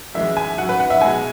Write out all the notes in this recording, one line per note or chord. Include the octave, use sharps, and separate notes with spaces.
F#2 E3 G#3 E5
G#5
F#2 F#3 F#5
B4
F#5
E5
B2 G#3 G#5